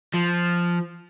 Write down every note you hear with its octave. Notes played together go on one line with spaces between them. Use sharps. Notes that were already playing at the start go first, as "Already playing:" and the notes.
F3